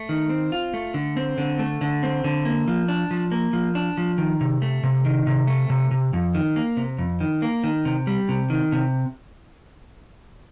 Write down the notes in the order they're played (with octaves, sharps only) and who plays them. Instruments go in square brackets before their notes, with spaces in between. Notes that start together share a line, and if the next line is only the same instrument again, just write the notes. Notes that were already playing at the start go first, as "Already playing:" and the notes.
Already playing: [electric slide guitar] A3
D#3
C4
F4
A3
D3
C4
D3
A3
D3
C4
D3
A#3
F3
D4
F3
A#3
F3
D4
F3
D#3
C3
A3
C3
D#3
C3
A3
C3
C3
F2
D#3
A#3
C3
F2
D#3
A#3
D#3
C3
G3
C3
D#3
C3